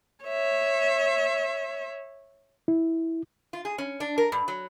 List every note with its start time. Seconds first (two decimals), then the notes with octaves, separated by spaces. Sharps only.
0.25 C#5 E5
2.68 E4
3.53 F4
3.65 G#4
3.78 C#4
4.00 D4
4.18 A#4
4.32 G2
4.48 F#3